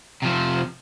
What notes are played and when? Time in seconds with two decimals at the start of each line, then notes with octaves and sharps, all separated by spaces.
0.22 C3 F3